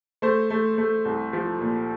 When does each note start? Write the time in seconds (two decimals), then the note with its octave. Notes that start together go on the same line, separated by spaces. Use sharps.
0.22 A3 C5
0.50 A3
0.78 A3
1.05 C2
1.33 F3
1.61 A#2